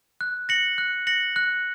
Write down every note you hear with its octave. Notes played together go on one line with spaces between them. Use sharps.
F#6
A#6 C#7 F#7
F#6
A#6 C#7 F#7
F#6